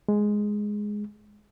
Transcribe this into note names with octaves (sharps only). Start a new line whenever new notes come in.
G#3